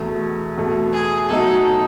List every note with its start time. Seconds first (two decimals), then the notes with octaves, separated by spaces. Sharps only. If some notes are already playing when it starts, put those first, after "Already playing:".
Already playing: E2 B2 A3
0.57 E2 B2 A3
0.93 G#4
1.29 B2 F#3 A3 D#4 A4